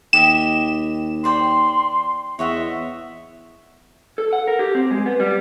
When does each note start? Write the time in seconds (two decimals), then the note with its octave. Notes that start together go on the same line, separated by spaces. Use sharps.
0.13 D#2 G4 D#5 E5 E7
1.24 C5 D5 G5 C6
2.39 E2 C#5 D#5 E5 F#5
4.18 A4
4.33 F#5
4.48 A#4
4.59 G4
4.75 C4
4.91 G#3
5.06 B3
5.20 G3